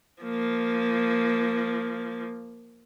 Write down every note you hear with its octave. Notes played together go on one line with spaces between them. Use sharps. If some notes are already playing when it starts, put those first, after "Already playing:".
F3 A#3